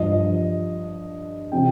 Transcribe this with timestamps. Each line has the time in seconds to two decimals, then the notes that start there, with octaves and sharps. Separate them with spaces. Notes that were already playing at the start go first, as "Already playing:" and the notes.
Already playing: G2 F3 D#5
1.52 C3 F3 G5